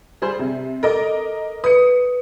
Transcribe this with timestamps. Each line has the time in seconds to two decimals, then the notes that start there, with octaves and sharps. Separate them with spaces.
0.22 G3 G#4 C5
0.39 C3
0.83 A4 A#4 D#5 D6
1.64 B4 D#6 C#7